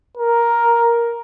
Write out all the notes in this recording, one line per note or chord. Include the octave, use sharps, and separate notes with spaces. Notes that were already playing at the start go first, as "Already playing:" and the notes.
A#4